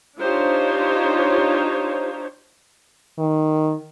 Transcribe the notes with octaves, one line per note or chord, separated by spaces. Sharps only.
D4 D#4 F4 G4 C5 C#5
D#3